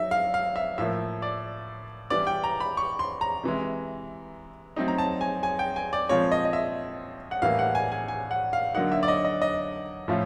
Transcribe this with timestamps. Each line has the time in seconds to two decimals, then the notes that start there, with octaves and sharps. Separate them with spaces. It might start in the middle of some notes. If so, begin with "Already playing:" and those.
Already playing: F#3 D#4 E5
0.11 F5
0.34 F5
0.56 E5
0.78 A2 F3 A#3 E5
1.22 D5
2.10 E3 G3 B3 D5
2.27 G5
2.44 A#5
2.60 B5
2.77 C#6
2.99 C6
3.21 A#5
3.43 C3 E3 G#3
4.76 F#3 A3 C4 D#4
4.88 A#5
4.98 A5
5.21 G#5
5.43 G#5
5.59 G5
5.76 G#5
5.93 D5
6.09 A#2 F3 G#3 C4 F4 C#5
6.32 D#5
6.45 D#5
6.53 E5
7.31 F#5
7.42 A2 E3 G3 A#3 F5
7.59 F#5
7.75 G#5
7.92 G#5
8.08 G#5
8.31 F#5
8.53 F5
8.75 D3 F#3 A#3 D#4 F#5
8.92 E5
9.03 D5
9.08 D#5
9.25 D#5
9.42 D#5
10.08 A2 F3 A3 C#4 F4